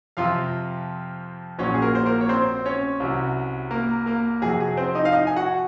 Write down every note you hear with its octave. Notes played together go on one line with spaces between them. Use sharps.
F2 C3 F3 F4 F5
A#1 A#2 F#3 C#4 C#5
G#4
A#3 A#4
C5
A#3 A#4
C#5
C4 C5
C#4 C#5
C2 C3 F#3
A#3 A#4
A#3 A#4
F2 C3 F#3 G#4
G#4
C4 C5
D#4 D#5
F5
D#4 D#5
G#5
F#4 F#5